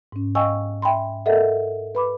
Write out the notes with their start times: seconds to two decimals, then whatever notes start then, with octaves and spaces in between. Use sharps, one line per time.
0.12 G#2 C#4
0.35 D#5 F5 G5 G#5 C#6 E6
0.82 E5 G5 G#5 B5 C6
1.26 A4 A#4 D#5 E5 F#5
1.95 B4 B5 D6